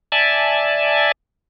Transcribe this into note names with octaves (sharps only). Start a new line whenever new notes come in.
D5 E5 G#5 A5